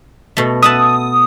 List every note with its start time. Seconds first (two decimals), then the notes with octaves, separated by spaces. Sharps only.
0.37 B2 A3
0.63 E5 F#5 A5 D#6